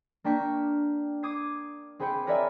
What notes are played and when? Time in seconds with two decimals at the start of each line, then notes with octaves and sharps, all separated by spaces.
0.24 A#3 D4 G5 C#6 B6
1.23 D6 D#6 G#6 C7
2.00 C4 G#4 B4 G5 C#7
2.27 A#4 B4 C#5 D5 E5 G#5